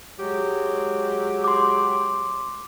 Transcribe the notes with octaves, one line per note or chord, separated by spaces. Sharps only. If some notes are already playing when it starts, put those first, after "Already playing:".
F#3 G#3 G4
C6 D6